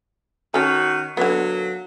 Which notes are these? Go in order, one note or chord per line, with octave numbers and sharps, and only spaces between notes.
D#3 C#4 F#4 A4
D3 F#3 A#3 B3 A4